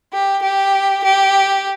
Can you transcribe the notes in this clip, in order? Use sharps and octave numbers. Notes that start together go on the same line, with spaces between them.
G4
G4
G4